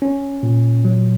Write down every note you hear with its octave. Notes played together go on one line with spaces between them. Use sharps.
C#4
A#2
F#3